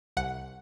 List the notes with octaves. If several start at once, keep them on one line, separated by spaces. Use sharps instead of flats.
C2 F#5